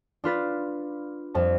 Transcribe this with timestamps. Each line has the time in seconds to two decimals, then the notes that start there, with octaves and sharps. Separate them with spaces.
0.24 D4 F4 B4 A6
1.35 F2 G3 A5